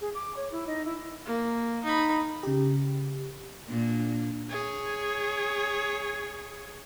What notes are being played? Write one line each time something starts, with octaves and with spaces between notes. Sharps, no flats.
G#4
D6
C#5
E4
D#4
E4
A#3
D#4 B5
C#3 G4
A#2 A#3 D4
G#4 C#5